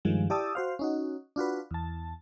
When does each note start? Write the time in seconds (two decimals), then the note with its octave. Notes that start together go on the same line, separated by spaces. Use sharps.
0.05 G2 D#3 F3 G#3
0.30 E4 G4 D5 A5 D#6 E6
0.55 F#4 C5 F5
0.79 C#4 D#4 F#4
1.36 D4 F4 F#4 B4
1.71 E2 A5